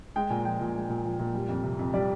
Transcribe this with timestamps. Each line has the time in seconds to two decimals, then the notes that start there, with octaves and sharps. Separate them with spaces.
0.16 G#3 G5
0.30 A#2 G#5
0.45 F3 G5
0.61 A#2
0.75 G#3
0.90 A#2
1.05 F3
1.19 A#2
1.35 G3
1.49 F2
1.63 C3
1.79 F2
1.94 G3 D5